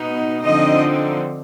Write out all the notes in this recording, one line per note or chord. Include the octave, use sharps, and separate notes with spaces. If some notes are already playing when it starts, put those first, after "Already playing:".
Already playing: B2 B3 D#4
D3 F3 C4 D#4 D#5